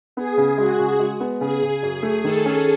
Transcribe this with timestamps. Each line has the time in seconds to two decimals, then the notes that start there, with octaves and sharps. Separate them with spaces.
0.17 B3 G#4
0.38 C#3
0.58 G#3 F#4
0.79 C#3
0.99 G#3
1.20 B3
1.40 C#3 G#4
1.62 C#3
1.83 F#2 G#4
2.03 A3
2.23 D#3 A4
2.45 C#4